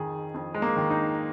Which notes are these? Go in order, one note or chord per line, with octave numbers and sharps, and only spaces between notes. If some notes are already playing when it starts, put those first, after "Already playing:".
Already playing: F2 D#3 G#4
F2
G#3
A#3
D#3
D#4